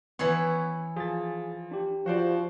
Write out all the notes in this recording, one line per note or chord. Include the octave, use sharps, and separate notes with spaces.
E3 B3 E4 C#5
F3 G#4 A6
D4 G4
F3 F#4 C5 D5